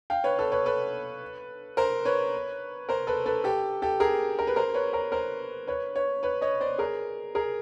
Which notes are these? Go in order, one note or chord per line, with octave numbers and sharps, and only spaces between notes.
F5 G5
B4 C#5
A4 B4
B4 C#5
A4 B4
A#4 C5
B4 C#5
A#4 C5
A4 B4
A4 B4
G4 A4
G4 A4
G#4 A#4
A#4
B4
A#4 C5
B4 C#5
A#4 C5
A#4 C5
B4 C#5
B4 C#5
B4 C#5
C#5 D#5
C5 D5
G#4 A#4
G#4 A#4